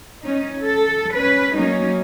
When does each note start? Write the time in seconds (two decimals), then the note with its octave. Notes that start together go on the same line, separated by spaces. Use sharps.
0.22 C#4 D#4
0.62 A4
1.14 C#4 B4
1.55 F#3 A#3 C#4 D#4